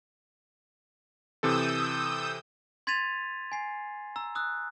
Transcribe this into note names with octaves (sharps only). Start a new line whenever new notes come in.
C3 E3 A4 D#6 E6 G6
C6 G#6 A6 B6 D#7 F7
G#5 C7
A#5 E6
D#6 E6 F#6